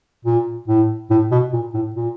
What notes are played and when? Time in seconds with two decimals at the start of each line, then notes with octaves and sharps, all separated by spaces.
0.25 A#2
0.68 A2
1.10 A2
1.31 B2
1.53 A#2
1.74 A2
1.96 A#2